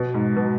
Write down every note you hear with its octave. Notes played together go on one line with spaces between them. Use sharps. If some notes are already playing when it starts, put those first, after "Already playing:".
Already playing: B2
G#2
B2